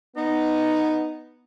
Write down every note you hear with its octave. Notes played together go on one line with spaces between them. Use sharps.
B3 D#4